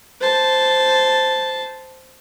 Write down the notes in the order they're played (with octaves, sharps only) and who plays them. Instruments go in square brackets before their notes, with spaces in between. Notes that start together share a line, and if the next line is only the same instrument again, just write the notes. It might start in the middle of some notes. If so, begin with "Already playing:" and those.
[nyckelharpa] C5 A5